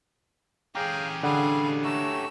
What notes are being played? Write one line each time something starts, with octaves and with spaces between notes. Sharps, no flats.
C#4 G4 G#4 F5 G5 A#5
D3 G3 G#4 F5 F#5
A3 F#4 A#5 E6